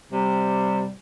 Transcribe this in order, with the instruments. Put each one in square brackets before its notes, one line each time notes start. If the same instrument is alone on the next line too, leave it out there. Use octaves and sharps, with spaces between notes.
[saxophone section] C3 G3